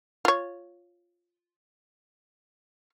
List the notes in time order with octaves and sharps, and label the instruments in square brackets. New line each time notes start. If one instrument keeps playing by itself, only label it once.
[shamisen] F4 C#5